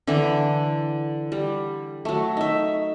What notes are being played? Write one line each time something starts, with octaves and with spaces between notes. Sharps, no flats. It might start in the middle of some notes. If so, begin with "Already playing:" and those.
D3 E3 D4 E4
G3
F#3 A3
D#4 E5